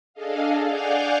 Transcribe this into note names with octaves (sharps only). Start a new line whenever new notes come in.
D4 G#4 A4 D#5 F5
D5 F5 F#5 G#5 F6 G6